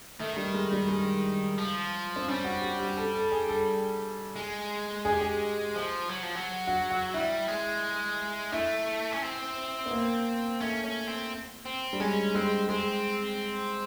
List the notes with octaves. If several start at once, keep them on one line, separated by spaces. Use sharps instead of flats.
D#3 A3
G3
G#3
G3
G#3
F3
C4
G3 C#4
F#4
G4
G4
A4
A4
G#4
A4
G#3
G#4
G4
G#4
F3
F#3
F3
F#3
F#4
F#4
G3 E4
G#3
A3 E4
C#4
C4
B3
A#3
A3 C#4
C#4
C4
C4
G3
G#3 C#4
G#3 C4
G#3 C4